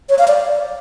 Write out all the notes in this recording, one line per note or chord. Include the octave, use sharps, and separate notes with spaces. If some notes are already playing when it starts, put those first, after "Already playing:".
C#5
F5
D5